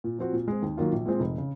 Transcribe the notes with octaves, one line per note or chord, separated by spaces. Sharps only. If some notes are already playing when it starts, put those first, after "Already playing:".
A#2
F3 C4 F#4
A#2
G#3 C4
D#2
D#3 F#3 A#3 F4
A#1
A#2 G#3 C4
F1
C#3